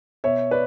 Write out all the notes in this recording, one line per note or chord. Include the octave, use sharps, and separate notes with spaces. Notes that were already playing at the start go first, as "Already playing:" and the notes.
B2 C#5 E5
B4 D5